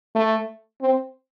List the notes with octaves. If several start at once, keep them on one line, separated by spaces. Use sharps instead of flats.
A3
C4